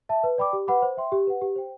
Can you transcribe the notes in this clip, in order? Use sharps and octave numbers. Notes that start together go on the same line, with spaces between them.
E5 A5
B4
D5 G5 B5 D6
G4
B4 F#5 B5 D6
C5
E5 G5 C6
G4
B4 F#5
G4
C5 G5